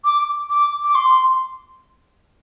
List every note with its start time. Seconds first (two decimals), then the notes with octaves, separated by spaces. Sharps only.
0.05 D6
0.50 D6
0.84 D6
0.95 C6